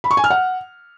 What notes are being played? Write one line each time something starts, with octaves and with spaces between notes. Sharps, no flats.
B5
C#6
G#5
F6
F#5